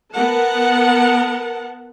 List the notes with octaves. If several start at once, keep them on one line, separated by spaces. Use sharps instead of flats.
B3 A#4 F#5 A5